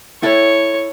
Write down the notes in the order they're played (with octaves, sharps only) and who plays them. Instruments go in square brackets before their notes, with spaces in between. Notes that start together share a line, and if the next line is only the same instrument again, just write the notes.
[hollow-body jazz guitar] E4 A4 [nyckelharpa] C#5